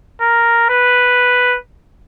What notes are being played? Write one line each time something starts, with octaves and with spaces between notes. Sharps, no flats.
A#4
B4